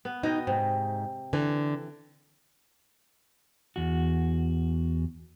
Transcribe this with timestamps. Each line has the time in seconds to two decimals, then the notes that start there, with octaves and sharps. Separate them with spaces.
0.05 B3
0.23 B2 D#4 D#5 G5
0.47 G#2 C3
1.33 D3 E3
3.76 E2 F#4